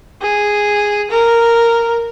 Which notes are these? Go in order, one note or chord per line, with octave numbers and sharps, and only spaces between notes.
G#4
A#4